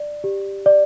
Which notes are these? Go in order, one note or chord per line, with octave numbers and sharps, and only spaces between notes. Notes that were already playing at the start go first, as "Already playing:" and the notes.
Already playing: D5
G4
D5